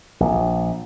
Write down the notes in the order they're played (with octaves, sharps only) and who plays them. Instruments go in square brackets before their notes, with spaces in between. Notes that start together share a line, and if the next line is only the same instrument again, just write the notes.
[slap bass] A#1